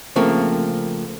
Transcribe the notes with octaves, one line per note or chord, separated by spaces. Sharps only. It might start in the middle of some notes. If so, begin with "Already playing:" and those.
C#3 F3 A3 A#3 C4